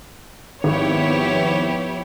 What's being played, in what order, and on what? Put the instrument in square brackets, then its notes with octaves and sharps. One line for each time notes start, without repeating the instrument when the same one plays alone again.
[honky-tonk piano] G#1 [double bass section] F3 B3 [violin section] E4 G4 C#5